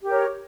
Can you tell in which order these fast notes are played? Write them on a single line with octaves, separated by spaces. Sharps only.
G4 A#4 C#5